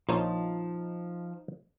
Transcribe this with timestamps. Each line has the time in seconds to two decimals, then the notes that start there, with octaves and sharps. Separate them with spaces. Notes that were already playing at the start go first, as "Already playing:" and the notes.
0.09 A#1 F3 D#4 F4 C5 C#5 A5